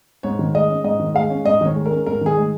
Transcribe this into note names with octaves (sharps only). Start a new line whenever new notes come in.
G#2 C#5
D#3
G#3 D#5
C#4
G#2 D#5
D#3
G#3 F5
C#4
G#2 D#5
D#3 C#5
G#3
A#4
C#4
G#2 A#4
D#3 G#4
G#3